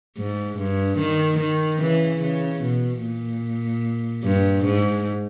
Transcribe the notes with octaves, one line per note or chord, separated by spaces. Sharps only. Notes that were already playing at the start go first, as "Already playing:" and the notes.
G#2
G2
D#3
D#3
C#3 E3
C#3
B2
A#2
G2
G#2